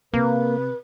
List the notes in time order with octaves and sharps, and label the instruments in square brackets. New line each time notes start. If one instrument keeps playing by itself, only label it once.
[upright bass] C3 [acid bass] A#3 [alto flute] B4